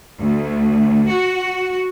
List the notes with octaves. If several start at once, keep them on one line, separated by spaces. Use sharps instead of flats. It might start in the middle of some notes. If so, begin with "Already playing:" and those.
D2
F#4